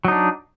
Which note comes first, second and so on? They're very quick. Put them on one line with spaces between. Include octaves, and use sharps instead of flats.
F#3 D#4 D4